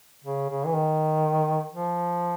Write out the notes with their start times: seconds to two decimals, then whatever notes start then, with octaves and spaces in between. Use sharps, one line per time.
0.24 C#3
0.50 C#3
0.66 E3
0.74 D#3
1.72 F3